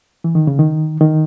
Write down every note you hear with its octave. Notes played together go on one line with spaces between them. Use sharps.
E3
D#3
C#3
D#3
D#3